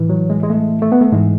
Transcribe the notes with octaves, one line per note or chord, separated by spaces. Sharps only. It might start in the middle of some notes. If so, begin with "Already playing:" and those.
Already playing: A2 E3
F#3
G#3
G#3
A3
A3
B3
A3
G#2 E3 G#3